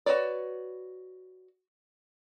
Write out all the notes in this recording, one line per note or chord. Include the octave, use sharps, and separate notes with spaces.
F#4 G#4 B4 C#5 D5